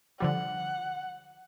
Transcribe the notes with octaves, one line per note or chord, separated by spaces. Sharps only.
D3 F3 G3 F#5